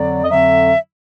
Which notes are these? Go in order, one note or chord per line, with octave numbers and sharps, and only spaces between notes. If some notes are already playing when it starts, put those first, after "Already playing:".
Already playing: F2 D3 F#3 D5
D#5
F2 D3 F#3 E5